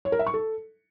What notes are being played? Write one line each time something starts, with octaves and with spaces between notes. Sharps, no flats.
C#5
A#4
E5
C#6
A4